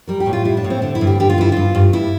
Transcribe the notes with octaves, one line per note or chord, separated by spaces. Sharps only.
G3 A#4
G4
A2
F4
G3 E4
D4
A2
C4
D3 D4
E4
G2
G4
D3 G4
F4
G2 E4
G2 F4
G2
G2 E4